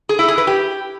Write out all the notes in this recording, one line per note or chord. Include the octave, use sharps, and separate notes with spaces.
G#4
E4
G#4
B4
G4